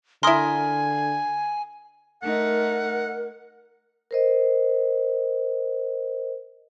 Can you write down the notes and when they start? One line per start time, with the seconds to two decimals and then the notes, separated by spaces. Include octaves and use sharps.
0.23 D3 E4 A#4 G#5 C6 D#6
2.23 A3 D#4 A#4 F#5
4.11 A#4 C5 D#5